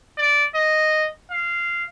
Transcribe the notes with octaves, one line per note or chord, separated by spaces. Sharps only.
D5
D#5
F5